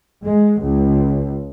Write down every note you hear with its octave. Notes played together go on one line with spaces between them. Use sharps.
G#3
C#2